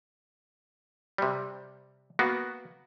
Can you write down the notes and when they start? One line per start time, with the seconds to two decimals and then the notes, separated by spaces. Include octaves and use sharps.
1.18 C3 G3
2.19 A#3 B3 F#4